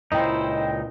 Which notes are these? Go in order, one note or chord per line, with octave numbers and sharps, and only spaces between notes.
C#2 A#2 D#4 E4 C5 D#5 G5